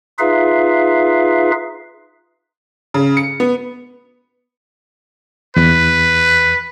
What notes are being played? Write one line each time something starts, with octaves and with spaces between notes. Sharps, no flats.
D#4 F4 G#4 B4 E5 F5
C#3
C#7
B3
E2 B4